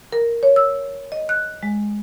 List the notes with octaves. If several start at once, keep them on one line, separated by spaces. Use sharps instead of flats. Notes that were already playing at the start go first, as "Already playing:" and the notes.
A#4
C#5
E6
D#5
F#6
G#3